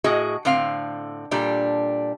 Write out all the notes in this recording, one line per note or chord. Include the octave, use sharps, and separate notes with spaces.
A2 F#4 G#4 D#5
A2 D3 C4 F5
A#2 G3 D4 A4